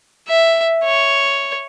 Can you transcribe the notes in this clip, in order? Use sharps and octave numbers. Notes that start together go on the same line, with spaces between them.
E5
C#5